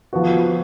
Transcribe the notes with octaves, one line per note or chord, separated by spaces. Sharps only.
F3 B3 F#4